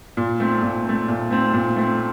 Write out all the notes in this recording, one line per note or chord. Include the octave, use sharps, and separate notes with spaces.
A#2
A3 C4
A#2
A3 C4
A#2
A3 C4
A#2
A3 C4